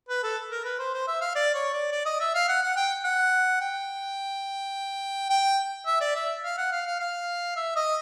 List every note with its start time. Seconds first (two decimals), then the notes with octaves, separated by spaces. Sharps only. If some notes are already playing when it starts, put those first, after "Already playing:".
0.09 B4
0.23 A4
0.51 A#4
0.65 B4
0.79 C5
0.94 C5
1.07 E5
1.21 F5
1.35 D5
1.55 C#5
1.73 D5
1.92 D5
2.06 D#5
2.20 E5
2.35 F5
2.48 F#5
2.63 F#5
2.76 G5
3.04 F#5
3.61 G5
5.30 G5
5.86 E5
6.01 D5
6.15 E5
6.43 F5
6.58 F#5
6.72 F5
6.86 F5
7.00 F5
7.56 E5
7.76 D#5